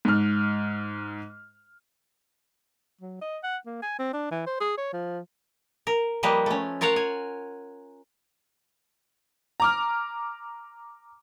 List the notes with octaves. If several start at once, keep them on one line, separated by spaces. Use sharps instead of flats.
G#2 F6
F#3
D#5
F#5
A#3
G#5
C4
D4
E3
C5
G#4
C#5
F3
A#4
F3 G3 A#3 B4 D#5
A3 C#4
F4 A#4 C#5 F5 F#5
G#5
A#5 D6 F6